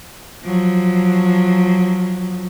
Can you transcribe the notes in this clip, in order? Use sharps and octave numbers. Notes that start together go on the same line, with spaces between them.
F3 F#3